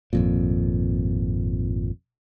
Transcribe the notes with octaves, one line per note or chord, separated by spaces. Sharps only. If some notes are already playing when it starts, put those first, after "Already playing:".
G#1 F2 A#2